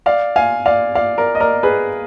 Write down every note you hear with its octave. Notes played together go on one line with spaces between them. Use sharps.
D5 F5
F5 G#5
D5 F5
D5 F5
A#4 D5
D#5
A#4 D5
G#4 B4